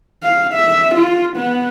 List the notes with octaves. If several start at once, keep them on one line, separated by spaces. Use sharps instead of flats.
F5
E5
F4
B3